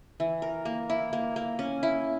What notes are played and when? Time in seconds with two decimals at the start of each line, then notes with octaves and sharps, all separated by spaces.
0.20 E3
0.42 A#4
0.65 A#3
0.90 E4
1.13 A#3
1.36 A#3
1.59 C#4
1.83 E4